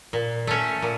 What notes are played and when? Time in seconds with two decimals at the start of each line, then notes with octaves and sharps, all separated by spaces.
0.13 A#2
0.47 A3 C#4
0.82 A#2